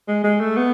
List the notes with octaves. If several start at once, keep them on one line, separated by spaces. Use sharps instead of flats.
G#3
G#3
A3
B3